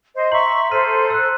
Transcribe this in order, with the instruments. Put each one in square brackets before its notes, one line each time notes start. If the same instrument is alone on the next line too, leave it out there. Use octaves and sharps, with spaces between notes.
[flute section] C5 D#5
[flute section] E5 C#6 [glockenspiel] A#5 C6 F#7
[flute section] A4 C5 [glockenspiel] F6 B6 D#7
[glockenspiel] E6 F#6